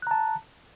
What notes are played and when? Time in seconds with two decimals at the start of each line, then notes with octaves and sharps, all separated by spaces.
0.02 F#6
0.07 A#5
0.11 A5